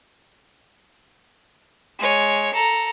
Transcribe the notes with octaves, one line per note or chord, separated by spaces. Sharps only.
G#3 C#5
A4 A#5